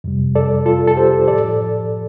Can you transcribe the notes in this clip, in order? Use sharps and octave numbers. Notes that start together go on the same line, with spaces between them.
F2 C3 G3
A4 D5
F4 A4
A4
G4 C5
A2 F3 A4 D5